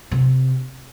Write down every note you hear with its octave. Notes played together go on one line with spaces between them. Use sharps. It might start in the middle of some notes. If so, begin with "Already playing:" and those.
C3